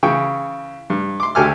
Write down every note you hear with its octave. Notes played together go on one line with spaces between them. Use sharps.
C#3 E3 G5 C#6
G2
C6 D6
D2 G4 A4 G#5 D6 F6